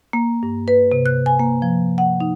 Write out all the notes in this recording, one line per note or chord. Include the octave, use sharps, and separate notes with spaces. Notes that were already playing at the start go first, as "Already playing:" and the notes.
A#3
G2
B4
C3
F#6
G#5
A#3
F3
F#5
D#4